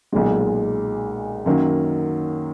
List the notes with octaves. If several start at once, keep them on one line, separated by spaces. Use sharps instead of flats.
B1 A#2 G#3
F#2 D#3 F#3 A#3